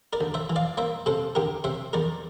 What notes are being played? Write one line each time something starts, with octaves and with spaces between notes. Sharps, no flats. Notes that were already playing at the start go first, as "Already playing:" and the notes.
A#4 D5
D2
C5 E5
E3
D5 F5
A#3 C5 E5
C3 A4 C5
D2 G4 A#4
C3 C5 E5
E2 A#4 D5